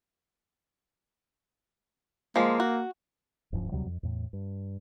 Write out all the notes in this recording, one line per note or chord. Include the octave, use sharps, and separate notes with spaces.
F3 G#3 A#3
F#4
D1 G2 F3 C#4
D2 C3 F#3 G3
F2
E2 A2
G2